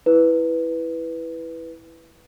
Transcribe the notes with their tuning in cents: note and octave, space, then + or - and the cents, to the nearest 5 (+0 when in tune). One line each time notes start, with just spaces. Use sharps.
E4 +0 B4 +0